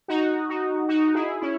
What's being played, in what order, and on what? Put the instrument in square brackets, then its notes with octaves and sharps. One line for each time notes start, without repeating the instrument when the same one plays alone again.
[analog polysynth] D#4 F#4
D#4 F#4
D#4 F#4
E4 G#4
C#4 E4